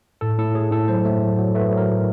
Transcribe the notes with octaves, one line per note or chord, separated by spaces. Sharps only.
A2 A4
A2 A4
A2 G#4
A2 A4
F#3 C5
A3
F#3
F#3
A3 B4
F#3
A#4
A2